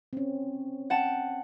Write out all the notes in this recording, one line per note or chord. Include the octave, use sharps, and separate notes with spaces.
C4 C#4
F#5 G5 A5